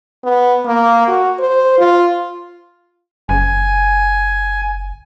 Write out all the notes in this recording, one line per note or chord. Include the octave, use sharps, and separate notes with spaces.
B3
A#3
F#4
C5
F4
F#1 G#5